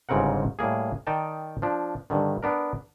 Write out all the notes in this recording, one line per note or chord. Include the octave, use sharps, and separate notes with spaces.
G1 G#2 C#3 C4 A#4 F#5
A2 G3 A#3 G#4
D#3 D#4 D5 G5 A5
F3 D4
G2 D3 D#3
B3 D4 A#4